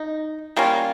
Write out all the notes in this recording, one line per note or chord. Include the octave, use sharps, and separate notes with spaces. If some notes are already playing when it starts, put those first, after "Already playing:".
Already playing: D#4
G3 A#3 C#4 F4